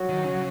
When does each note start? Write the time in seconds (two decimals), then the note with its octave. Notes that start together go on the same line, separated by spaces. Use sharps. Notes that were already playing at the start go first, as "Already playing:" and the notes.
Already playing: F#3
0.09 D#3
0.24 C#3